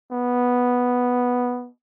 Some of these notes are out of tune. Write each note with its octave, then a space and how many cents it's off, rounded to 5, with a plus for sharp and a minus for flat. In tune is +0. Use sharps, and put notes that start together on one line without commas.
B3 -5